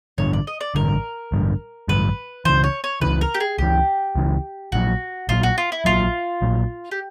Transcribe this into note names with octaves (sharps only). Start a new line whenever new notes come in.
A1 G2 D3 C#5
D5
D#5
D5
A1 G2 D3 A#4
A1 G2 D3
A1 G2 D3 B4
C#2 C#3 E3 C5
C#5
C#5
C#2 C#3 E3 B4
A#4
G4
G#4
C#2 C#3 E3 G4
C#2 C#3 E3
A#1 A#2 F#3 F#4
A#1 A#2 F#3 F4
F#4
F4
E4
A#1 A#2 F#3 F4
A#1 A#2 F#3
G4